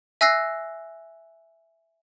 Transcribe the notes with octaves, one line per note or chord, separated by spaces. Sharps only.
E5 G#5 E6 F#6 A#6 C7